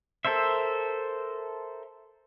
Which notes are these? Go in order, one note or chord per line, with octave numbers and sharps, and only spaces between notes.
A4 A#4 C5 E5